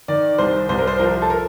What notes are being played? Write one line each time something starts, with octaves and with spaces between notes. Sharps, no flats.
D#3 D5
C2 C5
C2 C5
A#4
C5
F3 A#4
A4
A#4